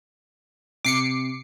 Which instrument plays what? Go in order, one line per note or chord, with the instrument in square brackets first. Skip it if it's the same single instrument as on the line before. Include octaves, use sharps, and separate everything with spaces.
[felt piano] C3 [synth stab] D6 C7 C#7